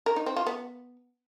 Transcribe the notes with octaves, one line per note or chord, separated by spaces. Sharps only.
A#4
D#4
C4
F4
B3